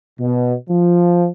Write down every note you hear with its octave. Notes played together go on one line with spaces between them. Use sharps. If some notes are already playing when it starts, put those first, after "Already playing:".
B2
F3